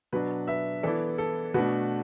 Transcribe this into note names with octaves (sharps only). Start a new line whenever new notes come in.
B2 F#3 D4 F#4 B4
B4 E5
E3 B3 E4 A4 D5
A4
B2 A3 D4 F#4 B4